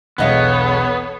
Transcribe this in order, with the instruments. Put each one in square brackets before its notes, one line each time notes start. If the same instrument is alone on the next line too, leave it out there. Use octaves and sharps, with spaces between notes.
[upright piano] E1 B1 [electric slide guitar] B3 [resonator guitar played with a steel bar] G#4 D#5 F5 [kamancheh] A4 C#5